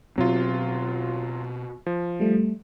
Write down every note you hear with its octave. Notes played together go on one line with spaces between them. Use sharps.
B2 F#3 C4 F4
F3
G3 A3